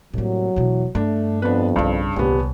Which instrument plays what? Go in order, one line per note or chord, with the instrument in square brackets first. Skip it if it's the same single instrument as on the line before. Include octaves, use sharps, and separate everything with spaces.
[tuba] C2 [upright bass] A2 A#3 [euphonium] F#3
[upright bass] E1 B2 [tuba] E3
[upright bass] G2 [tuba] A3 [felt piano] D4
[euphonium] F2 [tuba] B3 [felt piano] D4 B4
[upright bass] B1 E4 [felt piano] G2 [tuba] C#3
[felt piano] D#1 B3 [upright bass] C2 [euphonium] G4